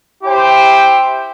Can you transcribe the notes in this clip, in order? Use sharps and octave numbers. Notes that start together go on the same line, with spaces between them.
E4 G4 C5 G5